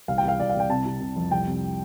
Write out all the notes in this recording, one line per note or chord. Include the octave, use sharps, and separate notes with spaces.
C2 F5
G5
C2 F5
C2 D5
F5
C2 G5
C3 A5
C3
C3
F2
C2 G5
C3